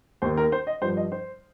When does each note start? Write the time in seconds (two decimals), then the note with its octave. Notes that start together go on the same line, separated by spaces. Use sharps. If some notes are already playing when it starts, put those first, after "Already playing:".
0.22 D#2 D#3 C5
0.37 A#4
0.52 C5
0.67 D#5
0.82 G2 F3 C5
0.97 D#5
1.12 C5